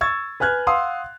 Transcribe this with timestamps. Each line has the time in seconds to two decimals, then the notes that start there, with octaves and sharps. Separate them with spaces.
0.01 C#6 E6 G#6 A6
0.40 B4 G#5 F6 F#6 G#6
0.67 F5 F#5 C6 D#6 E6